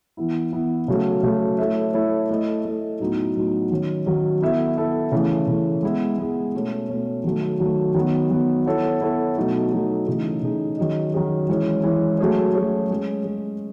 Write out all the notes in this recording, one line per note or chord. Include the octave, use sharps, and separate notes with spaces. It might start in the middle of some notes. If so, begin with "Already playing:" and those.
E3 B3 E4
E3 B3 E4
C#3 F#3 A3 C#4
C#3 F#3 A3 C#4
A3 E4 A4 C#5 E5
A3 E4 A4 C#5 E5
A3 E4 A4 D#5
A3 E4 A4 D#5
A2 F#3 B3 D#4 F#4
A2 F#3 B3 D#4 F#4
D#3 F#3 C#4
D#3 F#3 C#4
B3 E4 A4 E5
B3 E4 A4 E5
C#3 E3 A3
C#3 E3 A3
G#3 B3 E4 G#4
G#3 B3 E4 G#4
B2 A3 C#4
B2 A3 C#4
D#3 F#3 A3
D#3 F#3 A3
D#3 F#3 B3
D#3 F#3 B3
B3 E4 A4 C#5
B3 E4 A4 C#5
B2 F#3 A3 D#4 A4
B2 F#3 A3 D#4 A4
C#3 E3 A3 D#4 G#4
C#3 E3 A3 D#4 G#4
D#3 F#3 C#4 G#4 D#5
D#3 F#3 C#4 G#4 D#5
E3 G#3 C#4
E3 G#3 C#4
F#3 A3 C#4 G#4 C#5
F#3 A3 C#4 G#4 C#5
G#3 C#4 G#4
G#3 C#4 G#4